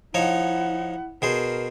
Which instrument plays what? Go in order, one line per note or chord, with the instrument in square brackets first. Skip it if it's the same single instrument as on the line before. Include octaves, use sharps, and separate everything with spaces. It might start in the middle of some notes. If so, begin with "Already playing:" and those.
[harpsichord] F3 D#4 C#5 [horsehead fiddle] E4 F#5
[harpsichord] B2 G#4 C5 [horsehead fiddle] A#4